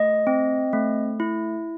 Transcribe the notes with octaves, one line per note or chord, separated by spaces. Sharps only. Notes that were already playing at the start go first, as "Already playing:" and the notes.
Already playing: A3 D#5
C4
A3
E4